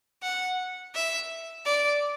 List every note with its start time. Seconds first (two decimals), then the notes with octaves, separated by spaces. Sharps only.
0.23 F#5
0.95 E5
1.65 D5